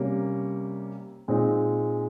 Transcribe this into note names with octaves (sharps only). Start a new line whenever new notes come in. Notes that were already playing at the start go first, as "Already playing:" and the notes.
Already playing: C3 G3 A#3 C#4
A#2 G#3 C4 D#4